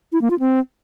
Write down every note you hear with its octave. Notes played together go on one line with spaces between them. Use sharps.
E4
A#3
F4
C4